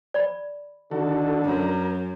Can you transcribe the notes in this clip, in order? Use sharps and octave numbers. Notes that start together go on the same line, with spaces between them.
D5 B5
D3 D#3 F#4 A4
F#2 A#4